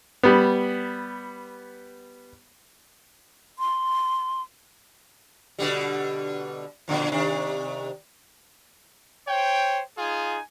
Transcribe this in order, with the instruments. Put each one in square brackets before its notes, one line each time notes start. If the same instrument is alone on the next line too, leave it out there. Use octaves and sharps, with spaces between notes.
[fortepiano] G3 B3
[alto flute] C6
[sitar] B2 D3 G3
A#2 D3 F3
C3 D#3 D4
[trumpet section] C5 C#5 G5
D#4 F4 G#4 G#5